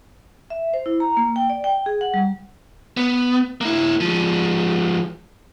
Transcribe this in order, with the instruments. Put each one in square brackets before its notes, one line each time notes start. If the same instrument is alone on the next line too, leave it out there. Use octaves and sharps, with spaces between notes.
[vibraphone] E5
C5
E4
A#5
A#3
G5
D5
G5
G#4
F#5
G3
[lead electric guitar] B3
A#3 E4
F3 G#3